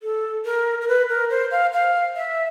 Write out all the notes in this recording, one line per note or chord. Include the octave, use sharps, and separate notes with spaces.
A4
A#4
A#4
B4
A#4
C5
F5
F5
E5